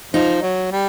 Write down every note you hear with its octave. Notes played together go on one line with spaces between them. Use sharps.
F3 D#4
F#3
G3